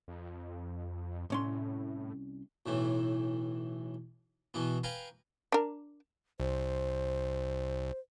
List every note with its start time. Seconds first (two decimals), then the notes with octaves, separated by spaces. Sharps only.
0.08 F2
1.30 C2 A2 C#4 C6
2.66 B1 A2 E3
4.54 B2 E3 B3
4.83 B4 F5 G5 G#5 A#5
5.52 D4 A#4
6.40 C2 C5